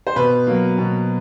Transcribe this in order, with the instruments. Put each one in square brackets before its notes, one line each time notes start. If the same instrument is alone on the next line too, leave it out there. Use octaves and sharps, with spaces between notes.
[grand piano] C5
B2 B4
F#3 A#3
B2